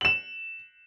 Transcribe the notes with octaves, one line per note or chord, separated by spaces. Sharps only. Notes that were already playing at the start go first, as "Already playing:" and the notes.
E7 F#7